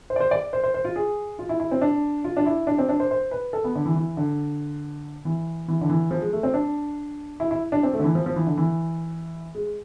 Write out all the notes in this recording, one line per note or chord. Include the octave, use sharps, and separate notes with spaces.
C5
D5
C5
D5
C5
C5
C5
F4
G#4
F4
E4
E4
C4
D4
F4
D4
E4
D4
C4
D4
C5
C5
B4
A4
B3
D3
E3
E3
D3
E3
E3
D3
E3
F3
G#3
A3
C4
D4
E4
E4
D4
C4
A3
D3
E3
F3
F3
E3
D3
E3
G#3